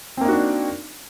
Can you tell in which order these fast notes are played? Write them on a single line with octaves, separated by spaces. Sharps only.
C4 A#3 D#4 F#4 D4